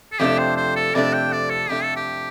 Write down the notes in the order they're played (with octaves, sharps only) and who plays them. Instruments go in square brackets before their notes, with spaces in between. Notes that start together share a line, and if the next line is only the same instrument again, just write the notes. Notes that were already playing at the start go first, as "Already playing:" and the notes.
[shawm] A4
[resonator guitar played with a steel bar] F2 C3 A3 D4 [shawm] G4
[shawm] C5
C5
A4
[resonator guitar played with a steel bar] F2 C3 A3 D4 [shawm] D5
[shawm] G5
D5
A4
[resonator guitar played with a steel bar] F2 C3 A3 D4 [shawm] G4
[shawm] A4
G4